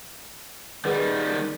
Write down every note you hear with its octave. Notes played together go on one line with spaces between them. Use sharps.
D#3 G3 G#4 B4 F#5